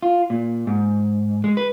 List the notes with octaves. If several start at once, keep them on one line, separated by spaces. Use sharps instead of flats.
F4
A#2
G#2
G#3
B4